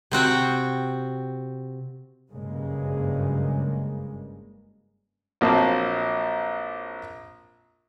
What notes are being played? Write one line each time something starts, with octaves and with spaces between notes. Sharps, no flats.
C3 C4 F#4 G5
F#1 G2 C#3 G#3 A#3
A#1 F#3 A#3 C4 A5